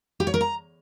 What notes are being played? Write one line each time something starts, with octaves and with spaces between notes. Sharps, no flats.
G4
C#5
A#4
A#5